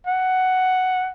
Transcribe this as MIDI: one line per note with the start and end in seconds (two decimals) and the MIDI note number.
0.07 1.09 78